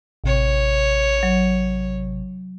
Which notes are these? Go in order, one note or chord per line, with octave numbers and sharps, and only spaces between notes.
A1 C3 C#5
F#3